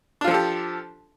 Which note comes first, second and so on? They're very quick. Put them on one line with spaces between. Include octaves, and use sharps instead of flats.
D4 F4 F3 A4 G4